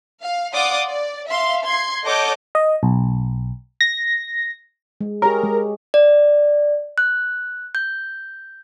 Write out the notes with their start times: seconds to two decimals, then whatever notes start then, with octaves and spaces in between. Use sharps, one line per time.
0.22 F5
0.53 D5 F5 F#5 C6 D6 D#6
0.87 D5
1.29 E5 F5 C6
1.64 C6 G#6 C7
2.05 A4 C#5 D#5 F#5 D6 G6
2.55 D#5
2.83 B1
3.81 A#6
5.01 G#3
5.22 G4 G#4 A#4 C#5 A#5
5.44 G#3
5.94 D5
6.98 F#6
7.75 G6